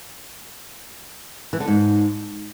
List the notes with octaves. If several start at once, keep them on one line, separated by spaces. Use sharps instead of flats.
E3
D3
G#2